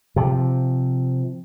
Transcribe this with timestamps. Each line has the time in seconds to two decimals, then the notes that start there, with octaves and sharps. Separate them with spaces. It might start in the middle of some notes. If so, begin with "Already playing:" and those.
0.16 C3 F3